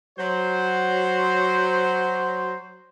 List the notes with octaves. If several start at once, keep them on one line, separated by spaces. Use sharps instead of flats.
F#3 C5